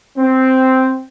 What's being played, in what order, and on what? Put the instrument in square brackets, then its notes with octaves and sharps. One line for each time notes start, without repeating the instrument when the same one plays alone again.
[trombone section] C4